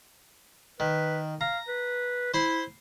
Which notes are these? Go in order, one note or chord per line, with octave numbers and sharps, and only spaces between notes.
D#3 B4
F5 A#5
B4
E4 C5 B5 C6